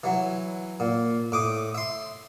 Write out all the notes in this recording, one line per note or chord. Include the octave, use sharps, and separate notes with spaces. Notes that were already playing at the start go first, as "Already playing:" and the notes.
E3 F#3
A#2
A2 D6 D#6
E5 C6